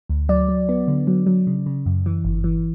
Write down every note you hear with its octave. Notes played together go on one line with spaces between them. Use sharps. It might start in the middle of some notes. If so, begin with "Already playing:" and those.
D2
F#3 D5
F#3
B3
D3
F#3
F#3
C#3
C#3
F#2
E3
G1
E3